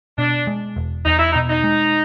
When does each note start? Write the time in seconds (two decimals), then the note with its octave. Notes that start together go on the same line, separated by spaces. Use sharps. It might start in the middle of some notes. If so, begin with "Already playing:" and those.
0.18 B2 D4
0.47 G#3
0.76 E1
1.05 E2 D#4
1.19 E4
1.32 D#4
1.35 B2
1.50 D#4
1.64 G#3